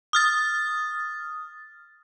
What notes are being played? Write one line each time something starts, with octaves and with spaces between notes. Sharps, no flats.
D#6 F6 A6